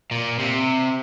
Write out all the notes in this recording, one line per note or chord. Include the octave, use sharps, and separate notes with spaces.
A#2
C3